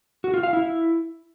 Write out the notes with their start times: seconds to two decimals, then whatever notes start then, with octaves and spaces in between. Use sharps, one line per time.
0.24 F#4
0.34 F4
0.43 F5
0.53 E4